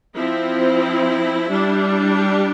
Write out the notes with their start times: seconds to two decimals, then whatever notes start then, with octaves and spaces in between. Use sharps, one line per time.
0.15 F3 C4 E4
1.50 G3 D4
2.17 G4